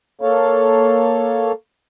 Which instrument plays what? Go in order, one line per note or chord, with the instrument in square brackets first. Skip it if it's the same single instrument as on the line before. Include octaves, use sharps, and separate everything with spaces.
[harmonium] A#3 A4 C#5 F5